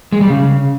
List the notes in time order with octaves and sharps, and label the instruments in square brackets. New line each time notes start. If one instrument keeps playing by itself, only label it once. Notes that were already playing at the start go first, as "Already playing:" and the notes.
[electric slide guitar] G#3
G3
C#3